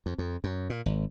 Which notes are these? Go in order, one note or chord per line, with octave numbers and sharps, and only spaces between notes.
F2
F2
F#2
A#2
G#1